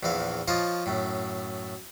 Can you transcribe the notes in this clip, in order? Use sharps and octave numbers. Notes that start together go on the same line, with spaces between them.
A#1 E2 E3 F5
F3 F4 C#5 D#5 A5
F#2 A2